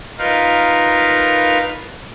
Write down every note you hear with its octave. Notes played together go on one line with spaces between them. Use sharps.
D#4 F4 A#4 B4 F5